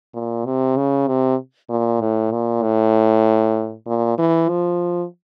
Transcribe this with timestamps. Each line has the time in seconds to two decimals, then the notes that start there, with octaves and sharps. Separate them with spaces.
0.14 A#2
0.45 C3
0.77 C#3
1.08 C3
1.70 A#2
2.01 A2
2.32 A#2
2.63 A2
3.87 A#2
4.18 E3
4.49 F3